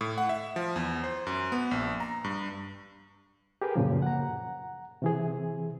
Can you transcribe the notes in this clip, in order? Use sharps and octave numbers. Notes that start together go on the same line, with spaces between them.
A2
F#5
E5
F3
E2
C5
F#2
B3
A#1
A#5
G2
G4 G#4 A#4 B4
F#2 A#2 C#3 F3
F#5 A#5
C3 E3 G#4